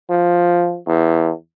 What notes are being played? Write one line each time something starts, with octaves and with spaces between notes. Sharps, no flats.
F3
E2